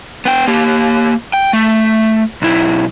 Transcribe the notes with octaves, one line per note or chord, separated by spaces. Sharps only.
B3 G5
A#3 G4
G5
A3
B1 E4